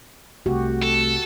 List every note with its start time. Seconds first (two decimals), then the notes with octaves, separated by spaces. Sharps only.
0.46 C2 C3 A3 F#4 G4
0.83 A4